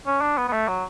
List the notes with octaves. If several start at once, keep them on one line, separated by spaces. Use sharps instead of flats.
C#4
D4
B3
B3
A3
F#3